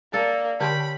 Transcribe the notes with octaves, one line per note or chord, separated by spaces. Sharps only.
A#3 D4 A4
D3 C#4 G4 A5 B5 C6